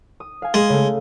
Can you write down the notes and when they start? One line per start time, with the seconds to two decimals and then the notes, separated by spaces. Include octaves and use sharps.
0.20 D#6
0.42 F5 G#5
0.54 G#3 G#4
0.69 C#3 A3